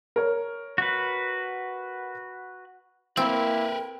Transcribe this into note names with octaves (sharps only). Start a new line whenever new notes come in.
A#4 C#5
F#4 B4
A#3 C4 E4 A#4 B4 G5